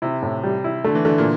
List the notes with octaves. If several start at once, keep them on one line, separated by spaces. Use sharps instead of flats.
C3 E4
A2
G3
E4
D3 A3
E3
D3 A3
A#2